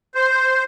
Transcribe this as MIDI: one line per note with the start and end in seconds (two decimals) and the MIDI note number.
0.15 0.64 72